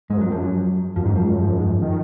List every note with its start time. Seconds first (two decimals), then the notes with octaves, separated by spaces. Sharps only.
0.10 G#2 G#3
0.17 F#2
0.21 F2 F#3
0.31 F#2 F3
0.42 F#3
0.96 F#2 F3
1.05 G#2 D#3
1.13 F#2 F3
1.23 G#2
1.31 F#2
1.41 G#2
1.49 F#2
1.58 G#2
1.67 F#2
1.82 D#3